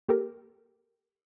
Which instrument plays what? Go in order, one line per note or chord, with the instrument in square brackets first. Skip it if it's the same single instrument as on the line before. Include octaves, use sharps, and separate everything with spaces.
[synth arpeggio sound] A#3 G4 A4 A#4